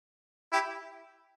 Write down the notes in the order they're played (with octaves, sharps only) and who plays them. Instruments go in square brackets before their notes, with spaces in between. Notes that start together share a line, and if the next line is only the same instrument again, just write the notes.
[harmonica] E4 G4